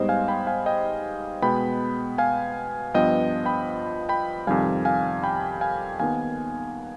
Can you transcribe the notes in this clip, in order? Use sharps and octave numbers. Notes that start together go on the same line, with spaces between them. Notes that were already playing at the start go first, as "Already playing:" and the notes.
Already playing: G#2 G3 B3 C5 D#5
F5 G#5
G5 B5
F5 G#5
D#5 G5
B2 G#3 B3 G5 B5
F5 G#5
G2 F3 B3 D#5 G5
G5 B5
G5 B5
F2 C3 D#3 G3 F5 G#5
F5 G#5
G5 B5
F5 G#5
D#2 D#3 B3 F5 G#5